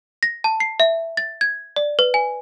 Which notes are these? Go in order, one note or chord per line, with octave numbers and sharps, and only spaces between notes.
A#6
A5
C7
E5
A6
G#6
D5
B4
G#5